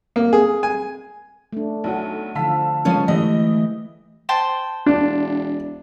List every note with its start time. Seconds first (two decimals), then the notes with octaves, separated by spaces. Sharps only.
0.16 A#3
0.33 G#4
0.63 G#5
1.53 A3 D4
1.84 B1 F#3 F#5
2.35 D3 F3 F5 A5 E6 B6
2.85 C#3 F3 G#3 B3 C#4 F4 C#5
3.08 E3 A3 E4 G4 D#5
4.29 C5 G5 A5
4.86 E1 D4